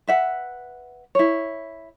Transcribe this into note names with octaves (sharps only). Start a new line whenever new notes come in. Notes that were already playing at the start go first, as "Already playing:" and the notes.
B4 E5 F#5
E4 C#5